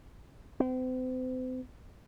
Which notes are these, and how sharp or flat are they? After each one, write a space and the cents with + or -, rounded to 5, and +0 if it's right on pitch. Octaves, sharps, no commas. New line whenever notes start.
C4 -40